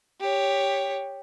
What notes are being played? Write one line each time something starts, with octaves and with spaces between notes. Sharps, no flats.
G4 C#5